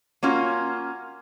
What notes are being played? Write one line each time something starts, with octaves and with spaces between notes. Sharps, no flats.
A#3 C#4 F4 F#4